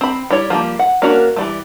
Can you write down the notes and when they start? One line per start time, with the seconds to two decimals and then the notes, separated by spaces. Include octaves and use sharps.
0.01 C4 B5
0.31 G3 E4 C#5
0.50 F3 G3 G#3 A#3
0.79 F#5
1.02 A#3 C#4 D4 F#4 A#4
1.36 E3 G3 A3